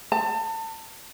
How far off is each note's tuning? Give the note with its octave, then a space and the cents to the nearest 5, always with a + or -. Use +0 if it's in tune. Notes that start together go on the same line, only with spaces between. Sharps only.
A5 +30